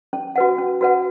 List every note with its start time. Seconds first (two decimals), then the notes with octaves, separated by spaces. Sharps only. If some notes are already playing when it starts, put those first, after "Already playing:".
0.13 C#4
0.36 F#4 B4 F#5
0.58 C#4
0.81 F#4 B4 F#5